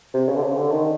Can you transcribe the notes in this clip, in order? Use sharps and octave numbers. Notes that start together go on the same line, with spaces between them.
C3
C#3
D3
C#3
D3
D#3